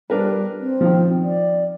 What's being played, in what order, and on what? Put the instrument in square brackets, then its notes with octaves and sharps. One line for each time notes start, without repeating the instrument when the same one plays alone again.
[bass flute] G3 [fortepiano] D4 A#4 B4
[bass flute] C4
[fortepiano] D#3 F3
[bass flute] D5